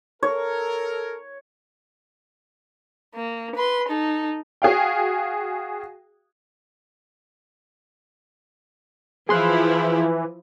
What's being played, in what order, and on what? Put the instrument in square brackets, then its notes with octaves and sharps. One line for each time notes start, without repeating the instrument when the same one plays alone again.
[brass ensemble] A4 A#4 [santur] C#5
[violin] A#3
B4 C6
D#4 A4
[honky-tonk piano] F#4 G#4 F5 G5
[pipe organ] E3 [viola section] F3 E4 [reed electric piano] G#4 C6 F#6